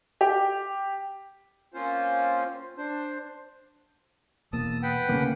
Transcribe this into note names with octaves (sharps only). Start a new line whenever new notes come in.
G4
A#3 C4 C#4 F4 C5
D4 C5
E1 E2 A#3 A5 D#6 E6
B4 F#5 G5
D2 A2 C#3 A#3